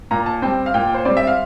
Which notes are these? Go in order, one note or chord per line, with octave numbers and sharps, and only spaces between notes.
A#2 A#5
A5
G3 C4 G5
F5
A#2 G5
C5
G3 C4 D5
E5
F5